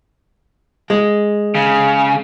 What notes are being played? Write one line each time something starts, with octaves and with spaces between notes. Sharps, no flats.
G#3
C#3